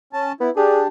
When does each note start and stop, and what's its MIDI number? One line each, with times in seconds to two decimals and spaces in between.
0.13 0.32 61
0.13 0.32 81
0.40 0.50 59
0.40 0.50 64
0.56 0.87 62
0.56 0.87 67
0.56 0.82 68